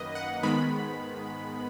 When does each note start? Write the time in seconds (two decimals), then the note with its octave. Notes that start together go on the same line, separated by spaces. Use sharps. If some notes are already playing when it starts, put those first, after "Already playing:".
Already playing: F#2 D#3 A#3 B4 D#5
0.15 F#5
0.43 G#2 D#3 G#3 B3 B5